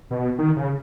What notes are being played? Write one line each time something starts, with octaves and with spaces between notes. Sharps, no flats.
B2
D#3
C#3